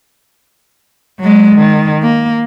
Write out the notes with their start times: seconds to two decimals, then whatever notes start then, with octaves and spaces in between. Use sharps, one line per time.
1.20 F#3 G#3
1.55 D#3
2.02 A#3